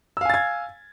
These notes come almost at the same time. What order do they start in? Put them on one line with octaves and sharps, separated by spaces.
E6 F5 G#5 A6 G#6